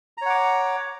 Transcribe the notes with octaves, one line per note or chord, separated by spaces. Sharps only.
C#5 F#5 A#5 D6